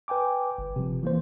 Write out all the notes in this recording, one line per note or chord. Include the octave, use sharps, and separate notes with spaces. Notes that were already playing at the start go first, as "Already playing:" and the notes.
B4 G5 G#5 D6
G1
C3 F3
E3 A#3 C5